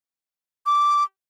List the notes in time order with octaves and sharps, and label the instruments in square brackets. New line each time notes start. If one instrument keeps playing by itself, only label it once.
[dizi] D6